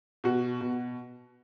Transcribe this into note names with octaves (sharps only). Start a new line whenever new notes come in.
B2 F#4
B2